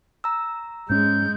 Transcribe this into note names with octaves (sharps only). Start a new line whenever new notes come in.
A#5 E6
G#2 G#3 C#4 G6